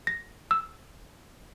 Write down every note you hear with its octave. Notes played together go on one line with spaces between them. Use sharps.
A#6
E6